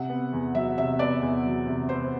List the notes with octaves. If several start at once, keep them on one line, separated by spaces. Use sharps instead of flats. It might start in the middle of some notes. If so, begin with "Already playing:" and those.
Already playing: C3 F#5
B3
E2
F#3 E5
C3 E5
B3 D5
E2
F#3
C3
B3 C5